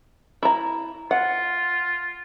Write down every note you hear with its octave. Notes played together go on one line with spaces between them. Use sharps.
E4 A#5
F4 F#5